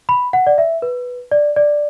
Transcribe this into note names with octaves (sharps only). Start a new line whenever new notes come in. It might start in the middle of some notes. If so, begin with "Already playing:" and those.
B5
F#5
D5
E5
B4
D5
D5